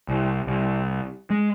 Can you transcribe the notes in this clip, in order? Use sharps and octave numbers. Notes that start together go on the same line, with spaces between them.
C2
C2
G#3